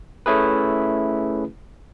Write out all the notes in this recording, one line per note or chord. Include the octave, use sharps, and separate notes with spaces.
A3 C#4 E4 G#4 B4